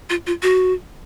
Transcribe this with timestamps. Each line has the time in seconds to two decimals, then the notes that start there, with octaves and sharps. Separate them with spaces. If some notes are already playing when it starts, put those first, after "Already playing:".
0.10 F4
0.27 F4
0.42 F#4